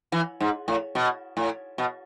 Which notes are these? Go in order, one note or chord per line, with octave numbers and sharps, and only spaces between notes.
E3
G#2
A2
B2
A2
B2